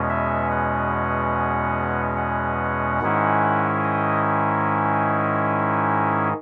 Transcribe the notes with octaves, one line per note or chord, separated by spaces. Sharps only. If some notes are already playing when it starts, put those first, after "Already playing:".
Already playing: E2 B2 G#3 C#4
E5
F#5
F#5
G#2 D#3 G#3 C#4 E4
D#5